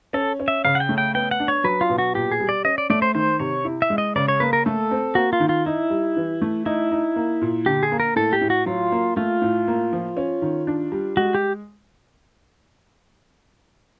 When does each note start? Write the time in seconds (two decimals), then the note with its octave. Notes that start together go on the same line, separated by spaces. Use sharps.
0.13 C#4 A4
0.40 C#4
0.48 E5
0.65 C#3 F5
0.75 F#5
0.80 G5
0.89 A3
0.98 G5
1.14 B3 G5
1.31 F#5
1.40 D4
1.48 C#5
1.64 F#3 B4
1.81 F4
1.90 B2
1.98 F#4
2.15 A#2 G4
2.32 G#4
2.40 G3
2.49 D5
2.65 C#4 D#5
2.78 D5
2.90 A3 D5
3.02 C5
3.15 D#3 C5
3.40 C3 C#5
3.65 E4
3.82 E5
3.90 G#3
3.98 D#5
4.16 C#3 D5
4.28 C#5
4.40 A#3 B4
4.53 A#4
4.66 A3 A4
4.91 C4
5.15 A#3 F#4
5.33 F4
5.40 D#3
5.49 F4
5.66 D#4 E4
5.90 G3
6.16 E3
6.42 A3
6.66 D#4 E4
6.91 D#4
7.16 A#3
7.42 A#2
7.66 D3 G4
7.83 G#4
7.92 A#3
8.00 A#4
8.16 A2 A4
8.33 G4
8.41 A2
8.50 F#4
8.66 F#3 F4
8.92 A#3
9.17 A3 F4
9.42 A2
9.68 A#3
9.93 F3
10.17 C#4
10.42 D#3
10.67 D4
10.92 G3
11.17 G#3 F#4
11.35 G4